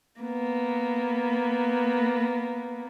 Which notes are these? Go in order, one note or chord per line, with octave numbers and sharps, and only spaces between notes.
A#3 B3